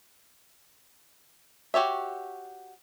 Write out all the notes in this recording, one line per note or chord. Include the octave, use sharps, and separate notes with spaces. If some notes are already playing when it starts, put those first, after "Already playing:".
F#4 G4 C#5 E5